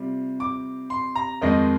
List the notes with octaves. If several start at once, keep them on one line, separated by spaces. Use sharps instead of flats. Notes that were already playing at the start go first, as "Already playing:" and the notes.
Already playing: C3 G3 F4
D6
C6
A#5
F2 D#3 G#3 D#5